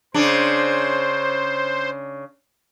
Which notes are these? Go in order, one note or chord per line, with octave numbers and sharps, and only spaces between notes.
C#3 D4 C5